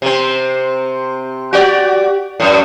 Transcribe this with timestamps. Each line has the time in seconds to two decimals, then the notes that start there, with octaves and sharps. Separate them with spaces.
0.02 C3 C4
1.53 F#4 G4 D5
2.40 F#2 A2